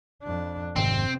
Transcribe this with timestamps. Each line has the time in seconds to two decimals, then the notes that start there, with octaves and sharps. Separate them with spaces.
0.23 F2 D4
0.76 F1 G#2 C3 D#3 C4